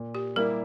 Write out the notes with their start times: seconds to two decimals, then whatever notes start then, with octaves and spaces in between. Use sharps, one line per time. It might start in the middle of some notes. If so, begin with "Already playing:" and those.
Already playing: A#2
0.15 G4
0.36 G3 A#3 E4 A#4